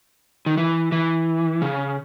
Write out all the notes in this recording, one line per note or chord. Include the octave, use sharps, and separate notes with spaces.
D#3
E3
E3
C#3